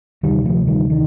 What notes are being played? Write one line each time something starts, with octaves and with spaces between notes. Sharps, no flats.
D2 C3 D#3 G3
F3 A3
D#3 G3
D#3